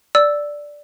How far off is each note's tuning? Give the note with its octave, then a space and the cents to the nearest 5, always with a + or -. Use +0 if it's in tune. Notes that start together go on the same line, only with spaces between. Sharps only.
D5 -5 E6 +0